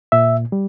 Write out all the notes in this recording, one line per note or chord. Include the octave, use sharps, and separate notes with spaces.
A#2 E5
G3